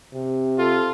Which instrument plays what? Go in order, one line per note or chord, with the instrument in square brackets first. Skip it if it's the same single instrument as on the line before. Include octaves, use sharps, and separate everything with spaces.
[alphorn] C3
[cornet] F4 [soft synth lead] A4